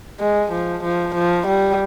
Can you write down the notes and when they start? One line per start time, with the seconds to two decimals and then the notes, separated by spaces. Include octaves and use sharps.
0.20 G#3
0.52 F3
0.84 F3
1.15 F3
1.47 G3